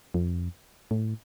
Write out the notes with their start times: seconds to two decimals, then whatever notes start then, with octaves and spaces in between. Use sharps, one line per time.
0.14 F2
0.91 A2